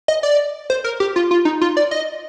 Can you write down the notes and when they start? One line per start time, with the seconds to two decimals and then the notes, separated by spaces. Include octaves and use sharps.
0.08 D#5
0.23 D5
0.70 C5
0.84 A#4
1.00 G4
1.16 F4
1.31 F4
1.45 D#4
1.61 F4
1.77 D5
1.91 D#5